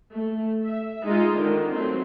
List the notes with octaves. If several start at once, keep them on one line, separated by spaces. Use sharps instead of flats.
A3
E5
G#3 D#4 F4
D3 D#3
F#3 A3 C4